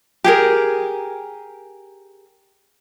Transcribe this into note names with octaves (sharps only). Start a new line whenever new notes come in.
G4 G#4 A#4